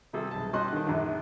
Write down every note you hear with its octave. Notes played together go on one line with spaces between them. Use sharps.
C3 G3 G#4 A4
B1 A5
G3 C#4 D#5 A5 C6 F#6
D3 D#3
A#1 F#2 D3